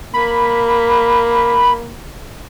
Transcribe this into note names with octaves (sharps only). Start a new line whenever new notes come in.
A#3 B5